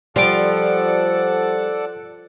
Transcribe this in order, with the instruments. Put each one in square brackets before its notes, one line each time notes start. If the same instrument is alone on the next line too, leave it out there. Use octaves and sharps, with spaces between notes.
[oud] F3 [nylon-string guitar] G3 [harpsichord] F4 D6 [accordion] A4 D5 F#5